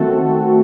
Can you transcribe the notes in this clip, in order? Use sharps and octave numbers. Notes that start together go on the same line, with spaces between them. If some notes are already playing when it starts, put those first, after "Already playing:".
Already playing: D#3 A3 C4 F#4 A4